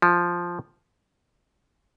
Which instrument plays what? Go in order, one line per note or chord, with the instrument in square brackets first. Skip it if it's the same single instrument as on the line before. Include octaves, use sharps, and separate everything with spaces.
[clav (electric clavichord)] F3